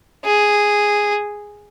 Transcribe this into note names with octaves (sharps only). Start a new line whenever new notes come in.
G#4